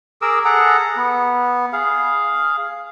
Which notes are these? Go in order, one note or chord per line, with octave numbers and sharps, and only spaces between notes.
G#4 A#4 D6 E6
G#4 A4 F#5 A#5
B3
G#4 F5